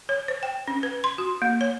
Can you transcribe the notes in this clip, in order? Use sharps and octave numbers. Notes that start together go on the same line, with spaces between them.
C#5
C5
G5
C#4
B4
C6
F#4
A#3
C#5